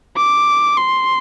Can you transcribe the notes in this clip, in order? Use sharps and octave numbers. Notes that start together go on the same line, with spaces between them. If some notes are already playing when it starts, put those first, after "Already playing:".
D6
C6